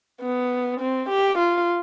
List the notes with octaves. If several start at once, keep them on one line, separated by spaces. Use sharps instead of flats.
B3
C4
G4
F4